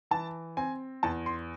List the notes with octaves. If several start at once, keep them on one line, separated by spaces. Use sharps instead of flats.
E3 A5
C4 G#5
E2 A5
C6